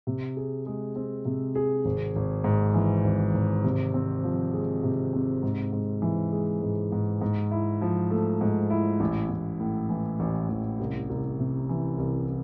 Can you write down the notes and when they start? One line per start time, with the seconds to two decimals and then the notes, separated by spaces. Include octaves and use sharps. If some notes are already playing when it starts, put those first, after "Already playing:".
0.07 C3
0.37 G#4
0.66 G#3
0.96 C4
1.25 C3
1.55 G#4
1.85 G#1
2.16 G#1
2.44 G#2
2.74 E3
3.04 G#1
3.34 G#1
3.64 C3
3.94 C4
4.23 F3
4.54 G#3
4.83 C3
5.13 C4
5.43 G#2
5.72 G#2
6.02 E3
6.32 G#3
6.62 G#2
6.92 G#2
7.21 G#2
7.51 E4
7.81 F3
8.11 A3
8.41 G#2
8.70 E4
9.00 A1
9.30 A1
9.60 A2
9.89 E3
10.20 A1
10.49 A1
10.80 C2
11.10 C2
11.39 C3
11.69 E3
11.98 C2